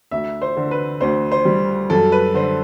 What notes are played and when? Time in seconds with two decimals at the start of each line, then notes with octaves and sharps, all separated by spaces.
0.11 D2 E5
0.42 C5
0.57 D3
0.71 B4
1.01 D2 C5
1.32 C5
1.45 G3
1.90 F#2 A4
2.12 B4
2.34 D3 C5